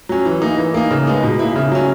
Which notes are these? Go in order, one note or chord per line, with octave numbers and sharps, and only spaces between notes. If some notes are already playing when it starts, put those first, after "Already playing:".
F#3 C#4
E3
A#3 D#4
E3
A#3 D#4
C#3
G#3 B3 D#4
B2
A#3 E4
C#3
F#3 C#4